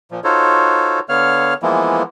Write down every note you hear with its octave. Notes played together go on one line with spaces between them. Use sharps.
A#2 F3
D#4 F4 F#4 A4 C5 C#5
D3 B3 C#5 F5 F6
E3 F3 G#3 A#3 B3 E4